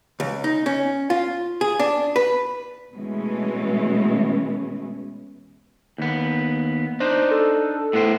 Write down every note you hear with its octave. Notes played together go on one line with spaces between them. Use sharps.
C#2
D#4
C#4
F4
G#4
D4
B4
B2 E3 G#3 A3 C#4
D#2 B3
D4 D#4 C5
A4
A2 B3 C5